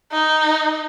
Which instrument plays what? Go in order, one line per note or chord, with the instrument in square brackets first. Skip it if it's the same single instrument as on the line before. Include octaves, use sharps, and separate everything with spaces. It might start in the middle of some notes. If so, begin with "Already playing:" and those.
[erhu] D#4